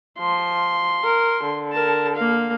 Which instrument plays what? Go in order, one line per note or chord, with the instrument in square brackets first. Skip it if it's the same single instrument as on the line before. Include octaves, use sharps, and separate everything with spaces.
[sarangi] F3 [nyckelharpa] C6
[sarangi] A#4
D3
[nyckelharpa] A#4 A5
A#3 F5